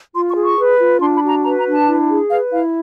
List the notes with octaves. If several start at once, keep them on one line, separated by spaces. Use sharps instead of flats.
F4 C6
C#6
G#4
C#6
B4
F4
D4 C6
B5
F#4
A#5
B4 A#5
A#5
D4
A5
E4
G#4
B4 F5
E4 F5